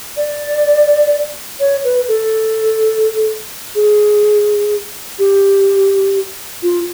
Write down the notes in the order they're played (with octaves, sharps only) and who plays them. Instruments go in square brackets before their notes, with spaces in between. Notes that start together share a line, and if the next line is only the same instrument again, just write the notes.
[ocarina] D5
C#5
B4
A4
G#4
G4
F4